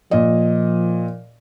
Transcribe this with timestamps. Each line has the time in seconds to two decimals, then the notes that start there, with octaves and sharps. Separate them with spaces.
0.11 A#2 F3 D#5